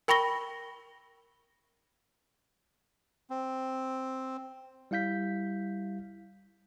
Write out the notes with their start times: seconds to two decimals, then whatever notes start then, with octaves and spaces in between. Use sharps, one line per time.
0.08 A#4 G5 B5 C#6 A#6 G7
3.30 C4
4.91 G3 E4 F5 G6 B6